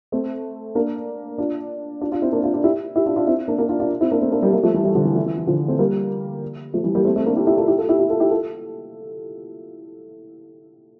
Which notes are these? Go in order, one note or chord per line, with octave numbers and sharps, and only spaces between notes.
A3 C4
A#3 D4
D4 F4
D4 F4
D4 F4
C4 E4
A#3 D4
D4 F4
D4 F4
E4 G4
E4 G4
D4 F4
D4 F4
C4 E4
A#3 D4
A#3 D4
D4 F4
D4 F4
C4 E4
A#3 D4
A3 C4
A#3 D4
G3 A#3
G3 A#3
F3 A3
E3 G3
E3 G3
D3 F3
E3
E3
E3
E3
D3 F3
A3 C4
G3 A#3
F3 A3
E3 G3
G3 A#3
A3 C4
A3 C4
A#3 D4
E4 G4
E4 G4
F4 A4
E4 G4
F4 A4
E4 G4
E4 G4
F4 A4
E4 G4
F4 A4